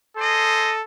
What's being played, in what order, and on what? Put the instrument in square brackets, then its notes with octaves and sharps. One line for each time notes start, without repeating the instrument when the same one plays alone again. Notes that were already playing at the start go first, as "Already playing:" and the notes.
[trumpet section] G#4 C5 D#5 [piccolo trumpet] A4